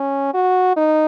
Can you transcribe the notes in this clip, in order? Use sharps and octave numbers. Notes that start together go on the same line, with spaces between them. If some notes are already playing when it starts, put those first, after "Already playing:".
Already playing: C#4
F#4
D#4